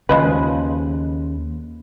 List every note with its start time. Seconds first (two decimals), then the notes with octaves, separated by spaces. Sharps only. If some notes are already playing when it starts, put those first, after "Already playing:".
0.09 D#2 C#3 F3 G#3 B4